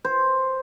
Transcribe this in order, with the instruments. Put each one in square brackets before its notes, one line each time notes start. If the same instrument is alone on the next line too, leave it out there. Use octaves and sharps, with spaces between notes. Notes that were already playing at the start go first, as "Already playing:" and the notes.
[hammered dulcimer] C5